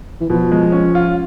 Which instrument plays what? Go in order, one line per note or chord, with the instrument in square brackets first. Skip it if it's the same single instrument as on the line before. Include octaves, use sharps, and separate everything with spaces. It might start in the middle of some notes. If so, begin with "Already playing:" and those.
[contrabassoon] E3
[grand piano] B2 [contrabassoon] F3
[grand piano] G#3
C#4
F4